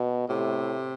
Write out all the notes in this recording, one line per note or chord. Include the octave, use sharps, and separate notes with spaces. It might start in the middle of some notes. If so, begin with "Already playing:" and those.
Already playing: B2
A2 C3